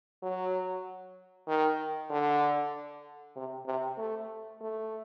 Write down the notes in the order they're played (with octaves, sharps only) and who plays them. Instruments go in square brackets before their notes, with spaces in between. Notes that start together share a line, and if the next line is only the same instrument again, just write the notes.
[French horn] F#3
D#3
D3
C3
C3
A3
A3